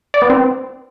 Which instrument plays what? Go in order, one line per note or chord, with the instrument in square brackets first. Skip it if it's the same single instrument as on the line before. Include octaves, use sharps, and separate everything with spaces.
[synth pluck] D5
B3
C4